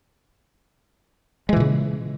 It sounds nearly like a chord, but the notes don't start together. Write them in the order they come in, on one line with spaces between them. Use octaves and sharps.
G#3 E3 A#2 C#3